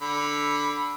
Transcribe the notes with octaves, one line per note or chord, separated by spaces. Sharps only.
D3 B5